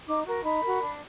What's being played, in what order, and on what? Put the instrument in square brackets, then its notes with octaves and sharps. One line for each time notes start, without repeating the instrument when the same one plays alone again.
[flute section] D#4 D6
F#4 A#4
D#4 B5
F#4 A#4
D4